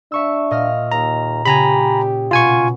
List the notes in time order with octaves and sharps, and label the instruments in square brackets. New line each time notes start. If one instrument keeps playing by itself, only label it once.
[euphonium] D4 [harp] E5 C#6 E6
[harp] A#2 D#5 F6
[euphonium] D#2 [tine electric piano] A#5
[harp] C#3 C#4 [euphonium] G4 [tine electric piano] G#5 A#5 B5
[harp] B2 [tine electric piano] F4 G#5 C#6